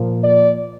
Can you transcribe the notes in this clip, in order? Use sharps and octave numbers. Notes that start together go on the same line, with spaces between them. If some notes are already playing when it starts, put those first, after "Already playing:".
Already playing: A#2 F3 A#3
D5